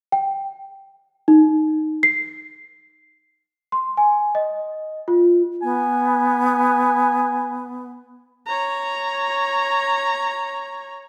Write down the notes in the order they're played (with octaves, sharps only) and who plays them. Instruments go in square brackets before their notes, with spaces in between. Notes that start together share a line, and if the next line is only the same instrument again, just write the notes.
[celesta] G5
D#4
C7
C6
G#5
D#5
F4
[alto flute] B3 [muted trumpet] G#5
[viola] C#5 A#5